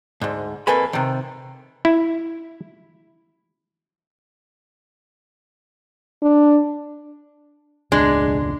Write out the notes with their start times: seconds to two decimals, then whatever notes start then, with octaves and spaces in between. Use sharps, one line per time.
0.21 D2 G#2
0.67 F2 A#3 A4 B4 G#5 B5
0.93 C3 D#3
1.85 E4
6.22 D4
7.92 E1 C#2 G#3 D4